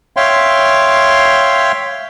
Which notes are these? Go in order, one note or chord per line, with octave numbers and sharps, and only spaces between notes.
C#5 E5 F5 G5 C6